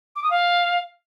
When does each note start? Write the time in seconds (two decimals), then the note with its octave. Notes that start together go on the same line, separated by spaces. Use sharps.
0.16 D6
0.23 D#6
0.30 F5